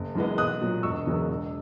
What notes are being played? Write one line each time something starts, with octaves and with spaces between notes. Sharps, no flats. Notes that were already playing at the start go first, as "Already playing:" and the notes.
Already playing: F#1
F#2 E3 G#3 B3
B1 D#6 F#6
A#2 F#3
E1 C#6 E6
E2 C#3 F#3 A#3
E1